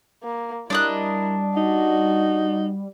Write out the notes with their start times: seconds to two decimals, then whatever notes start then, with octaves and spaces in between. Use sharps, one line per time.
0.23 A#3
0.70 G3 D4 E4 A#4 D#5 F#6
1.57 D#4 F#4